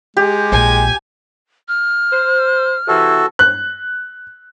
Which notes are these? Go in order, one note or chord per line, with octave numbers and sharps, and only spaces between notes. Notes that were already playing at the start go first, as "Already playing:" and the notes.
G#3 G4
A#1 G#5
F6
C5
C3 E3 F#4 A4
F#6